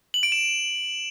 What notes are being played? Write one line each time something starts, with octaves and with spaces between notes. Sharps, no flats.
F#7
D7
E7